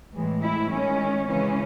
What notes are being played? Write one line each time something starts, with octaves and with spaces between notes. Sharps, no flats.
A2 E3 G#3
E4
D#3 G#3 C#4
C#3 E3 G#3 C#4